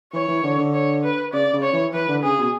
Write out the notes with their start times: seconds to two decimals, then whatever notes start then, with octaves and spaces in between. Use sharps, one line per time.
0.13 E3 C#5
0.28 E3
0.43 D3
0.58 D3
0.73 C#5
1.03 B4
1.33 C#3 D5
1.53 C#3
1.63 C#5
1.73 E3
1.93 E3 B4
2.08 D3
2.23 C#3 G#4
2.39 B2